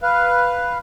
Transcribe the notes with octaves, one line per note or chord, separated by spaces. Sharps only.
B4 F5